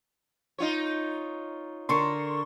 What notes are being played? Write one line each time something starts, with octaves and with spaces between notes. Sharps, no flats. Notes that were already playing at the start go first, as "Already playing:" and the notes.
D#4 F4 C#5
D3 A4 A#4 C6 C#6